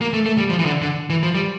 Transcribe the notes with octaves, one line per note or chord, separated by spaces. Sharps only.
A#3
A3
A3
G3
F3
E3
D3
D3
E3
F3
G3